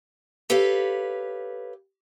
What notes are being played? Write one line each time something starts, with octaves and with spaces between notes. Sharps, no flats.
G4 A4 B4 C#5 F5